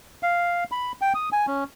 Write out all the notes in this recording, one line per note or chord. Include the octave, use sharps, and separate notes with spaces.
F5
B5
G5
D#6
G#5
C#4